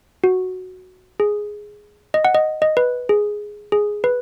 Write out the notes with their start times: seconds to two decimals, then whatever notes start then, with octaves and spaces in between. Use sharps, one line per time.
0.24 F#4
1.20 G#4
2.14 D#5
2.25 F#5
2.35 D#5
2.62 D#5
2.77 B4
3.09 G#4
3.72 G#4
4.04 B4